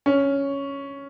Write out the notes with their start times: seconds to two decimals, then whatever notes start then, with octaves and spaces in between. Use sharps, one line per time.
0.06 C#4